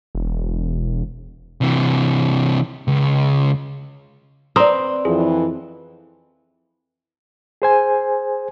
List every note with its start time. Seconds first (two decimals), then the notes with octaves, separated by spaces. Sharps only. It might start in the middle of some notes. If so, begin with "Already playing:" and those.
0.15 E1
1.61 C3 E3
2.88 C#2
4.56 C4 B4 D5 A#5 D#6
5.05 F2 E3 G#4
7.62 G#4 C5 G#5